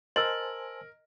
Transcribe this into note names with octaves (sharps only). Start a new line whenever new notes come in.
A#4 C5 D#5 G#5 A5 E6 F6 F#7